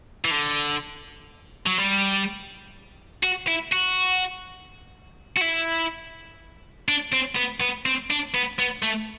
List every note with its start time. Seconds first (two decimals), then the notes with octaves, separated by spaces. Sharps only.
0.25 E3
0.31 D3
1.66 F#3
1.78 G3
3.23 F#4
3.47 E4
3.72 F#4
5.37 F#4
5.42 E4
6.88 D4
7.13 C4
7.36 B3
7.61 B3
7.86 C4
8.10 D4
8.34 B3
8.59 B3
8.82 A3